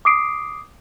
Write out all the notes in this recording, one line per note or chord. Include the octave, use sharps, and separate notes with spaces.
D6 D#6 C7 D7